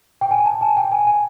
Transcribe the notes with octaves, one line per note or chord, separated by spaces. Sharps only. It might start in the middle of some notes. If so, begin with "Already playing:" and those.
G5
G#5
A5
G#5
G5
G#5
G#5